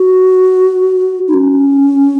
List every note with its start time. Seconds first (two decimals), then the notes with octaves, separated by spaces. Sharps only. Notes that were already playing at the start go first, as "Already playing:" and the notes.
Already playing: F#4
1.28 D#4
1.34 C#4